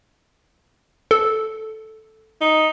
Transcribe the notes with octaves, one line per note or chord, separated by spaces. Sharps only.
A4
D#4